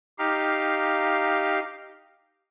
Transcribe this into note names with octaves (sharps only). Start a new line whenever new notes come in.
D#4 G4 F5